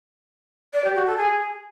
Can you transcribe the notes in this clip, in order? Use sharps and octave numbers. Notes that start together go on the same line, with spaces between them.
D5
G4
F#4
A4
G#4